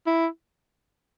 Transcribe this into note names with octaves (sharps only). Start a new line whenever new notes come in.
E4